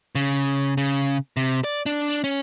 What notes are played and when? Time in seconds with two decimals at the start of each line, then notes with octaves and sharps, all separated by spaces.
0.15 C#3
0.77 C#3
1.37 C3
1.64 D5
1.86 D4
2.24 C#4